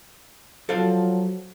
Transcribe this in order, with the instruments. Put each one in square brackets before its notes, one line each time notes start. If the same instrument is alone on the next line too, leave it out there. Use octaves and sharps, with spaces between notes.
[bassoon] F3 [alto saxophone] F#3 [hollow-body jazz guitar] A4 F5